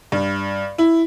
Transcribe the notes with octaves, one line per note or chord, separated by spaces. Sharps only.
G2
E4